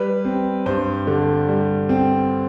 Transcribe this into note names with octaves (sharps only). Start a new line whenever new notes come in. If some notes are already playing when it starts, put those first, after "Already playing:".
Already playing: G3 B4
C4
G2 C5
D3
G3
C4